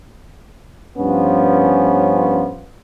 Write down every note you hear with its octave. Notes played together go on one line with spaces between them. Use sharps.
G2 F3 B3 C#4